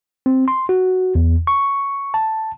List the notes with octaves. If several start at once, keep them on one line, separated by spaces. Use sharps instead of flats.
C4
C6
F#4
E2
C#6
A5